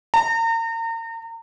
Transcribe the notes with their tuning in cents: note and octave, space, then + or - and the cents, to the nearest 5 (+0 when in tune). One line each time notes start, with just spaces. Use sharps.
A#5 -35